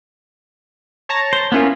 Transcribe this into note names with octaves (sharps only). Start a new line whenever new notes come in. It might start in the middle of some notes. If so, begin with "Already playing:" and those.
C#5 A5 A#5
C5
A#3 B3 C#4 E4 F4 A#4